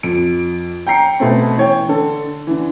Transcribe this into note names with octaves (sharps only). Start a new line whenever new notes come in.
F2 D7
G5 A#5 C7 C#7
B2 A3 C4
E3 C#5 G5
D3 A4
D3 E3